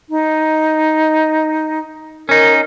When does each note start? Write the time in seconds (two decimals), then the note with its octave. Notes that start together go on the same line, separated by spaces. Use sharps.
0.09 D#4
2.29 C#4 D#4 A#4